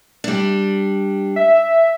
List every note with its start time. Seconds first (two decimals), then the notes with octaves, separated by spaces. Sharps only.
0.24 G3 D4
1.36 E5